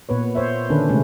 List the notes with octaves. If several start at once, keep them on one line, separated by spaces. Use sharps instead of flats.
A#2 B3 B4 C#5
C5 C#5 E5
D3 D#3 C#4 D4 B4
C3 G#3 A3 C#4